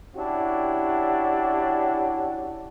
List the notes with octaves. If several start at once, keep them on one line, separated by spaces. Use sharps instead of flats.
C#4 D4 E4 F#4 G4